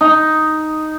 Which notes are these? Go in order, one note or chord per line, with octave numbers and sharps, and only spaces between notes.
D#4